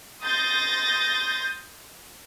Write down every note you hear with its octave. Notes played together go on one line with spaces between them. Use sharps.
C6 D#6 G6 A6 A#6